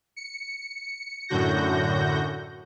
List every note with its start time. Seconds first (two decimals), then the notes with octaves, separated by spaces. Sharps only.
0.16 C#7
1.28 F#2 A2 D3 F#4 G6 A#6